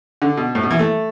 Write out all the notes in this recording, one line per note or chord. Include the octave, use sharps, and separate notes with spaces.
D3
B2
A2
B2
E3
A3